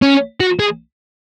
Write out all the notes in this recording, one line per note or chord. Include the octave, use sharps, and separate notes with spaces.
C#4
F#4
G#4